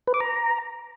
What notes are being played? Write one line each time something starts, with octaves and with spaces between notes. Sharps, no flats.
B4
D6
A#5